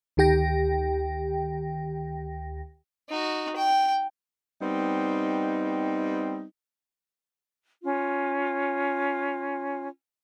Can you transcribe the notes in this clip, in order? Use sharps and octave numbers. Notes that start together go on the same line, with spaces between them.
D2 D#3 G4 G5 A#6
D#4 F#4
G5
G3 B3 C4 D#4
C#4 F4